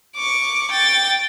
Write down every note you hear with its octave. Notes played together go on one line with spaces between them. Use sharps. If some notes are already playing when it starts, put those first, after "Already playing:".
C#6 D6
G5 A6